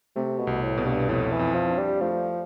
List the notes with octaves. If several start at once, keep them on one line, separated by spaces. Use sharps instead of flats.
C3 A3
B2
C2
A2
B2
G2
F2 A2
E3
F2
F3
D4
G3
F3 A3